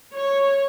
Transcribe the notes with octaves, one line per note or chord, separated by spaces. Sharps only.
C#5